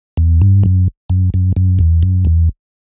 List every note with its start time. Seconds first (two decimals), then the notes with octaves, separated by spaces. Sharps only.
0.17 E2
0.41 G2
0.64 F#2
1.10 F#2
1.34 F#2
1.56 F#2
1.79 E2
2.03 F#2
2.25 E2